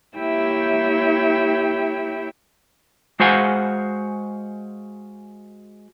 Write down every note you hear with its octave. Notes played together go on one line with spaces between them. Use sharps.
A#3 E4 G4 C#5 E5 G5
G#3 F#4 C5 F5 F#5 G#5